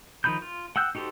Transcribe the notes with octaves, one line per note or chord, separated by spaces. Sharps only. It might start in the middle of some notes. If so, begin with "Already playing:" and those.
D#3 F3 D#4 B5 G6
F4
F#5 G5 E6 F#6 G6
D#4 F#4 G4 A4 C5